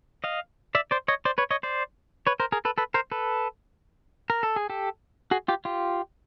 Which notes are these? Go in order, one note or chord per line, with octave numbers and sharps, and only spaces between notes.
D#5 F5
D5 E5
C5 D5
C#5 D#5
C5 D5
B4 C#5
C#5 D#5
C5 D5
B4 C#5
A#4 C5
G#4 A#4
A4 B4
A4 B4
A#4 C5
A4 B4
A#4
A4
G#4
G4 A4
F#4 G#4
F4 G4
F4 G4